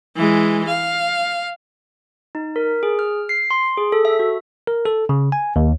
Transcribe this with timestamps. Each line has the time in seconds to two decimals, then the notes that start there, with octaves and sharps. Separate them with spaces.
0.16 E3 G#3
0.68 F5
2.35 D#4
2.56 A#4
2.83 G#4
2.99 F6
3.29 C7
3.51 C6
3.77 G#4
3.92 A4
4.05 E5
4.19 F#4
4.67 A#4
4.85 A4
5.09 C#3
5.32 G#5
5.56 D#2